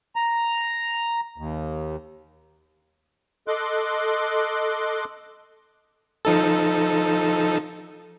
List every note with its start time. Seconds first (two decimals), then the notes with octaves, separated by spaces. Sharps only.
0.16 A#5
1.38 D#2
3.48 A4 D#5 C6 D6 F#6
6.25 F3 D#4 A4